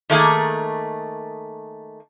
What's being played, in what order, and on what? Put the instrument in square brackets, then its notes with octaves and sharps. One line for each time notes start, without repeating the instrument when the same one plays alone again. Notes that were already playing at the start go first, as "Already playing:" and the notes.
[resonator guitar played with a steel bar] D#3 A3 A#3 G#4